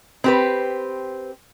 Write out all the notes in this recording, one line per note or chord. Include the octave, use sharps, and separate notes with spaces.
C4 G4 B4